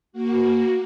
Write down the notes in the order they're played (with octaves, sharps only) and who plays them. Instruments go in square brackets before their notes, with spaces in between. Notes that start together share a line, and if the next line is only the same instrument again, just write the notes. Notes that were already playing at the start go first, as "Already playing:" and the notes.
[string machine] A#3 F#4